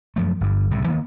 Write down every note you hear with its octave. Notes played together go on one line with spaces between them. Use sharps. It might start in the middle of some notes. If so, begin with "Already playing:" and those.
F#2 F3 A3
G1 G2
C2 A2 C#3
D#3 E3 A#3 B3